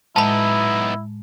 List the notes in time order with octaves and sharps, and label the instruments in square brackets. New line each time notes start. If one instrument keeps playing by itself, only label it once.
[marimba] A2 G#3 [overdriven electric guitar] B3 D#4 [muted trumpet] E4 [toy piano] A5 B5